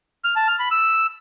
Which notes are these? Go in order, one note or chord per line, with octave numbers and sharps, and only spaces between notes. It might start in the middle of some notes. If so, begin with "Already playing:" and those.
F6
A5
F6
B5
E6